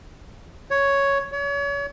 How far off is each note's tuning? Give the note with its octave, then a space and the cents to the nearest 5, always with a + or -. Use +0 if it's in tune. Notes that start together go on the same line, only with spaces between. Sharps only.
C#5 +5
C#5 +35